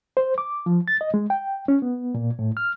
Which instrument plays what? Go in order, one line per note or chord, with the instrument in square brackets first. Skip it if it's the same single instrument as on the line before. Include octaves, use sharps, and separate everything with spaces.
[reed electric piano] C5
D6
F3
A6
D#5
G#3
G5
C#4
B3
A#2
A2
F6